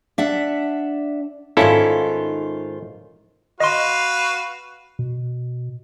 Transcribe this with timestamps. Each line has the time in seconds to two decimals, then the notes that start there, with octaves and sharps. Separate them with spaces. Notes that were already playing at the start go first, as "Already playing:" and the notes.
0.18 D4 E5 F#5
1.57 G#2 D#3 C#4 E4 F4 A4
3.60 F#4 B4 D#5 F5 C6
4.99 B2